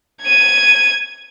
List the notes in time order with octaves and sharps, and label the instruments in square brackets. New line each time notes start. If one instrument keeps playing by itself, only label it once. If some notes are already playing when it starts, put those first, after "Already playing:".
[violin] G#6 D#7